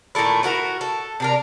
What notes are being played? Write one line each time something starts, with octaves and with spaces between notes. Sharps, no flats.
A#2 D#3 A3 E4
E4 F#4 G4 A#4
A4
C3 D4 A#4